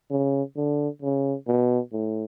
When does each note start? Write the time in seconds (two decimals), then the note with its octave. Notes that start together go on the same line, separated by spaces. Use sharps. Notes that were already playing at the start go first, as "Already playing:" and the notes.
0.11 C#3
0.56 D3
1.02 C#3
1.47 B2
1.93 A2